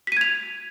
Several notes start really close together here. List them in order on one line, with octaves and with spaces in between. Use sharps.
B6 D#7 G#6 F7